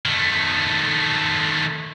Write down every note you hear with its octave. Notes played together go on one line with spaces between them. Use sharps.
D#3 A3